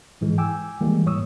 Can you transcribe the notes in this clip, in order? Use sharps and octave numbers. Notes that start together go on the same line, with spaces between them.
G#2 E3 G#3
G5 G#5 D6 E6
E3 G3 G#3 A#3
G#2 C#5 C#6 D#6 E6